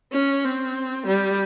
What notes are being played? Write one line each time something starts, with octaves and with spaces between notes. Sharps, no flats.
C#4
C4
G3